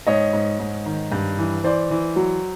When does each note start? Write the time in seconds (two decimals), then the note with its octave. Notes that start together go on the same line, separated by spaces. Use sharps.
0.07 G#2 C#5 D#5
0.33 G#2
0.59 G#2
0.86 D#3
1.12 G2
1.38 E3
1.64 E3 C5 D5
1.91 E3
2.16 F#3